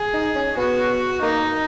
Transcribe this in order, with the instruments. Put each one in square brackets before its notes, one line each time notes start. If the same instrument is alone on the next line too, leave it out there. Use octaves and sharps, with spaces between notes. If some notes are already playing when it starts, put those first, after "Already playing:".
Already playing: [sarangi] G#4
[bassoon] D#4
C#4
[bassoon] B3 [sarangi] F#4
[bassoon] A#3 [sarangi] D#4